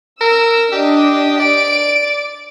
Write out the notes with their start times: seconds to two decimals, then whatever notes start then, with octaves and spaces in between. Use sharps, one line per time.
0.21 A#4 E6
0.72 D4 G4 D#5
1.40 D5 D7